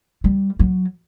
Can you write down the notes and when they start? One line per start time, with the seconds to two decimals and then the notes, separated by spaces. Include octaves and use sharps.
0.24 G3
0.59 F#3